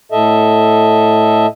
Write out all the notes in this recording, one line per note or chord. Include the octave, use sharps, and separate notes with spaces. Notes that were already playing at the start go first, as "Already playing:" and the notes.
A2 A4 D#5 E5